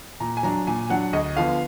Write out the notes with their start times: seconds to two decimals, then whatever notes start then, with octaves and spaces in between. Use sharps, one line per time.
0.20 A#2 A#5
0.37 G#5
0.43 F#3 D4 A#5
0.67 A#2 G#5
0.90 F#3 D4 F#5
1.13 D2 D#5
1.37 D3 F3 B3 F5